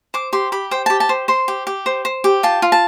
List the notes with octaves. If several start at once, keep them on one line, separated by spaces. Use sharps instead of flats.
C5 D6
G4 C6
G4 B5
C5 G5
G4 A5
A5
C5
C5 C6
G4
G4
C5
C5
G4
F4 A5
F4
A5